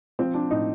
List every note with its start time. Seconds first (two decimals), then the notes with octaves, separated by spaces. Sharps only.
0.19 F3 C4
0.34 D4
0.51 A2 D#4